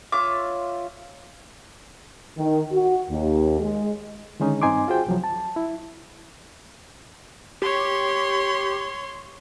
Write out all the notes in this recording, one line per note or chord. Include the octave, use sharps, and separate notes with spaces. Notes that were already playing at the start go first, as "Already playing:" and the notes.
F4 C#5 E5 D6
D#3
F#4
D#2
G#3
D3 D#3 G#3 C#4 D#4
G2 C4 D#4 G#5 C6 D6
F4 F#4 G#4 C5 G5
C2 F3 F#3
A5
E4
G4 C#5 C6